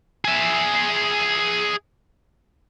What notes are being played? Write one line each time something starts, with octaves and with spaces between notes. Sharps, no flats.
G#4 E5